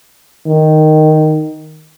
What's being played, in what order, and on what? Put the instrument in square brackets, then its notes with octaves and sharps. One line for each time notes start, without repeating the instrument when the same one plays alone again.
[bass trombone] D#3